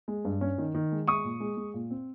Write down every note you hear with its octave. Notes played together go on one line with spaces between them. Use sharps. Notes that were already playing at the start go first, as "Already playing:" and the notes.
G#3
G2
C#4
D#3
D#3
G#3
G#3 C#6 D#6
A#2
G#3
G#3
A#2
C4